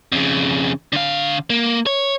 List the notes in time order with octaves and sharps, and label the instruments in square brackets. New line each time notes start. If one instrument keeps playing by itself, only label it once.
[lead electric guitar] F2 C#3
D3 F5
A#3
C#5